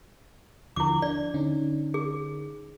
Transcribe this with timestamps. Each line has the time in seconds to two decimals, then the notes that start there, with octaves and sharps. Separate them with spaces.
0.76 D#2 D3 F3 E4 D6
1.02 D4 D5
1.34 D3 C#4 D#4
1.94 G#4